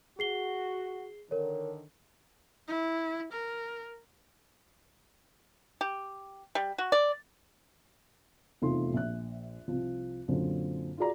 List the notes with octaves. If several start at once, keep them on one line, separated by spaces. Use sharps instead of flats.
F#4 G#4 C7 G7
D3 D#3 A#4 C#5
E4
A#4
G4
G3
F#4
D5
F1 E2 F3 A3 D#4 C6
A#1 E5 F#6
C2 F3
F#2 A#2 D3 C4
F4 F#4 G#4 D5 A#5